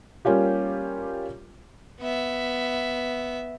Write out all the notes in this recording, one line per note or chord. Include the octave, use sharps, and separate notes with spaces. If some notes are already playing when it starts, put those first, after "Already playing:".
G3 A#3 C#4 F4 G4
B3 E5